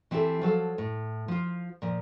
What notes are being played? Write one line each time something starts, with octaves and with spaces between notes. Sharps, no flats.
E3 C4 E4 G4 A4
F3 F#3 A4 F5
A2
F3 F4
A#2 F3